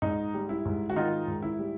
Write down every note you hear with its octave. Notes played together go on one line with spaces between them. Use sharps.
G#2 D#4
G3
E4
G#2
F#4
D#3 D#4 F4
G#2
E4
G3